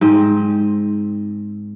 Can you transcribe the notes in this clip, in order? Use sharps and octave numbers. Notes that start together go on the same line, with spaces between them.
G#2 C4 D#5